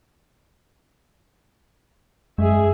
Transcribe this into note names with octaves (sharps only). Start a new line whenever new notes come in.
F#2 G#3 G#4 E5